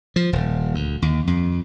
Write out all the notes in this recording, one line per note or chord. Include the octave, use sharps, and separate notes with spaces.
F3
D#1
D2
D#2
F2